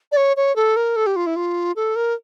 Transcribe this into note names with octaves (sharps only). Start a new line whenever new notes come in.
D5
C#5
C#5
A4
A#4
A4
G4
F4
E4
F4
A4
A#4